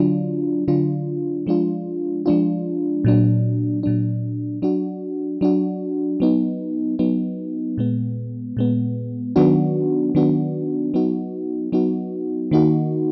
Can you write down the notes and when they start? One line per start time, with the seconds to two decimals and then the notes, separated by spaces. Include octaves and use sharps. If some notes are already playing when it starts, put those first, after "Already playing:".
Already playing: D3 F#3 D4 F4
0.68 D3 F#3 D4 F4
1.47 F3 G#3 D4 F4
2.26 F3 G#3 D4 F4
3.04 A#2 F#3 D4
3.83 A#2 F#3 D4
4.62 F#3 D4 F#4
5.41 F#3 D4 F#4
6.20 F#3 B3 D#4
6.99 F#3 B3 D#4
7.78 A#2 G#3 B3
8.57 A#2 G#3 B3
9.36 D#3 F#3 B3 D4 F#4
10.15 D#3 F#3 B3 D4 F#4
10.94 F#3 B3 D#4 F#4
11.72 F#3 B3 D#4 F#4
12.51 D#3 A#3 D#4 F#4